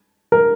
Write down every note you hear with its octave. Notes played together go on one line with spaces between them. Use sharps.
A#4